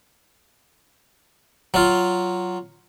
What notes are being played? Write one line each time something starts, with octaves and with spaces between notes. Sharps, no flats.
F#3 F4